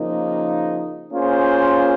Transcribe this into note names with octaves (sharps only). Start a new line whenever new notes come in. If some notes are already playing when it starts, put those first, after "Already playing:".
Already playing: C#3 F3 A#3 D#4
A#3 C#4 F4 G#4 C5